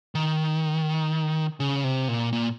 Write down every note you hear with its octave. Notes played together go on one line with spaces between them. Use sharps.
D#3
C#3
C3
A#2
A#2